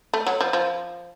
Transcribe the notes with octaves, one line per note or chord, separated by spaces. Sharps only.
A3
F#3
F3
F3